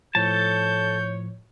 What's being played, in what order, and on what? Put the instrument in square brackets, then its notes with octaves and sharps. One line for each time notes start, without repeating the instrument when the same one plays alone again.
[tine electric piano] A2 F3 [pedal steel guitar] A4 A5 [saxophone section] C#5 [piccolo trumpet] G6